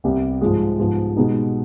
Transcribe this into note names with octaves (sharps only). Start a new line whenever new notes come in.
C2 C3 G3 B3
G#2 F3 G#3
G#2 F3 B3
B2 G#3 B3 D#4